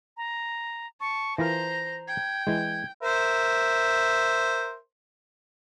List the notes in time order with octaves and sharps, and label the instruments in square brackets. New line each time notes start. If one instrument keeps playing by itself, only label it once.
[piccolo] A#5
[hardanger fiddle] A5 [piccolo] C#6
[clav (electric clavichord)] E3 F4 A#4 [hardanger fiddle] C5 A#5 [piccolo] A#6
[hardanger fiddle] G5 [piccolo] G#6
[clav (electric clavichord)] E3 G#3 [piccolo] G#6
[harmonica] A#4 C5 E5